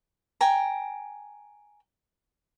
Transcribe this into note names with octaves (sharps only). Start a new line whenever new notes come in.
G5 G#5 A#5